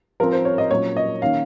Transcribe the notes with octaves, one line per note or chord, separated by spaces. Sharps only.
F3 C4 A#4
C5
C#5
D#5
A#2 F#3 C#4 C#5
D#5
D#3 A#3 C#4 F5